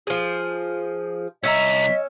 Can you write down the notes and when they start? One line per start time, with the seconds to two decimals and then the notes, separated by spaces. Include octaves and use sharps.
0.07 F3 G#4
1.43 C2 C#4 D#5 E5 A#5 B6